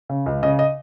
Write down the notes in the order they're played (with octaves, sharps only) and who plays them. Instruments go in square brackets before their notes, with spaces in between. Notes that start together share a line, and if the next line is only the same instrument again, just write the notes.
[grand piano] C#3
C#2
C#3 D#5
D#5